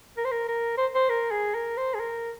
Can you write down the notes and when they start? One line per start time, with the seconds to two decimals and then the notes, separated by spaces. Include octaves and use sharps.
0.17 A#4
0.25 C5
0.31 A#4
0.48 A#4
0.78 C5
0.95 C5
1.09 A#4
1.31 G#4
1.55 A#4
1.77 C5
1.94 G#4
2.00 A#4